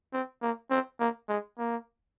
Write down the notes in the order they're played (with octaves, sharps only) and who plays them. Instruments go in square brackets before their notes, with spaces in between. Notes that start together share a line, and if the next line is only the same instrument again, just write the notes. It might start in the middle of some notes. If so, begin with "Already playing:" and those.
[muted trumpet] C4
A#3
C4
A#3
G#3
A#3